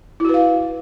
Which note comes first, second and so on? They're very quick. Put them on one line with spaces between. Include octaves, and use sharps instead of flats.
E4 F#4 B4 F5